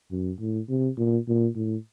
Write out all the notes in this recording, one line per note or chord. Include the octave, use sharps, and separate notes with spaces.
F#2
A2
C3
A#2
A#2
A2